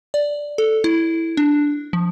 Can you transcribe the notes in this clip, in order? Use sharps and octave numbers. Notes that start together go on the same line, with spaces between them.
D5
A4
E4
D4
F3